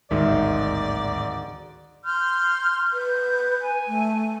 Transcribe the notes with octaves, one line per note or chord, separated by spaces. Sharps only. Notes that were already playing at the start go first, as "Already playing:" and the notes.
D1 A1 D#2 G#2 D#3 D5 E5
C6 F6 G6
B4 G6
G#5
A3